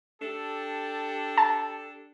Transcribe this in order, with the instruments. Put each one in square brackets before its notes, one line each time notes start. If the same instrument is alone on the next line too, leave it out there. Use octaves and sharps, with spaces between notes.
[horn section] D4 G4 A4
[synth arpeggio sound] A5